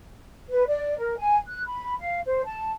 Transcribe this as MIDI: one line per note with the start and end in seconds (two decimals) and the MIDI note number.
0.50 0.62 71
0.67 0.96 74
0.98 1.15 70
1.17 1.36 80
1.47 1.63 90
1.65 1.94 83
1.99 2.20 77
2.26 2.41 72
2.45 2.70 81